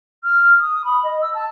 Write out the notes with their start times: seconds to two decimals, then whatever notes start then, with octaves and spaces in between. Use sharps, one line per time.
0.24 F6
0.60 D#6
0.85 B5
1.03 D#5
1.21 E6
1.34 A5